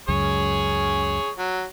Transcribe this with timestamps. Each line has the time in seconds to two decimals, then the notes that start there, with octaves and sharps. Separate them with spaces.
0.08 C#2 F#2 G#4 C#5
1.38 F#3